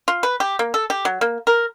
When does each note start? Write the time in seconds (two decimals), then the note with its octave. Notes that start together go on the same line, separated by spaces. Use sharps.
0.08 F4
0.23 B4
0.40 G4
0.59 A#3
0.74 A4
0.90 G4
1.05 F#3
1.21 A#3
1.47 A#4